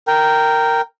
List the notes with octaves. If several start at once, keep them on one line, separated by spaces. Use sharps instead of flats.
A#4 G5